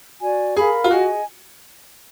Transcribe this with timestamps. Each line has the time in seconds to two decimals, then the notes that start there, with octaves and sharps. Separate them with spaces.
0.22 F#4 D5 G#5
0.57 G#4 A#4 F5 B5
0.84 F4
0.91 F#4 G#4 D#5 G#5